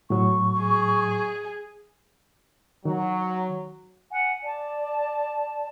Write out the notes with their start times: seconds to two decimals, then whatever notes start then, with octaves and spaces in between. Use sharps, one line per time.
0.10 A2 F#3 C#6
0.59 G#4
2.85 D#3 F#3
4.10 F#5 G#5
4.43 D5 A5